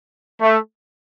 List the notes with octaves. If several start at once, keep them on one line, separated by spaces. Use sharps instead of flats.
A3